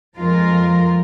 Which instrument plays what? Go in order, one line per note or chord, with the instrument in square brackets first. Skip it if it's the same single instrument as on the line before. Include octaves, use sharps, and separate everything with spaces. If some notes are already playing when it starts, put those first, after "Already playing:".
[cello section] F2 F3 G#3 F4 A#4